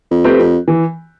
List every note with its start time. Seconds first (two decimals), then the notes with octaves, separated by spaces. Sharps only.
0.11 F2
0.24 A3 C4 G4 B4
0.39 F2
0.68 E3